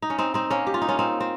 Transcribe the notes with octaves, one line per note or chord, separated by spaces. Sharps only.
D#4
C#4
C4 D#4
C4 D#4
A#3 C#4
G4
F4
D#4
C#4 F4
C4 D#4
C4